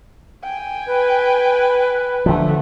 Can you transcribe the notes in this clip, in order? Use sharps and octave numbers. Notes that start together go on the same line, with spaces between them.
G5 G#5
B4
D3 F3 A3